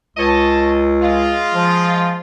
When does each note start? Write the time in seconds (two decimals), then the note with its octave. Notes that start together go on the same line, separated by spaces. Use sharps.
0.17 C#2 C#5 D#5 A5
1.02 G#3 F4
1.54 F3